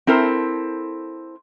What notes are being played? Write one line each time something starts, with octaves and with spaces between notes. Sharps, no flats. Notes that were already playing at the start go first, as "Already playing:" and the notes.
C4 E4 A4 A#4 C5